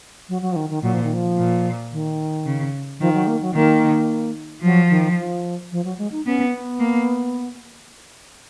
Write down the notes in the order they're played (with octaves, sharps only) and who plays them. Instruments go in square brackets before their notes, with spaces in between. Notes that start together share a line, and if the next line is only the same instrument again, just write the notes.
[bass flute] F#3
F#3
F3
D#3
D#3
[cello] A#2 [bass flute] F#3
[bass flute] F3
D#3
F3
[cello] A#2
[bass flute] D#3
[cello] C#3
[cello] D#3 [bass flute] F3
[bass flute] F#3
A#3
F#3
[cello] D#3 [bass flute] A#3
[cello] F3 [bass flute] F#3
[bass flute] D#3
F3
F3
F#3
G#3
D#4
[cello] B3 [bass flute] C#4
[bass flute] B3
[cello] A#3